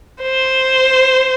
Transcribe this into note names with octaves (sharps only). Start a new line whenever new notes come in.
C5